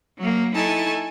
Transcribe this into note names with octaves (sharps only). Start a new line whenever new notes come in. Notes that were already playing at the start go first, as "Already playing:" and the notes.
F#3 A#3
D#4 E4 A4 G#5 A5 C#6